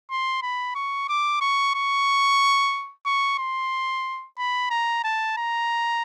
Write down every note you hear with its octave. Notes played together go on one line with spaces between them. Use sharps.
C6
B5
C#6
D6
C#6
C#6
C#6
C6
B5
A#5
A5
A#5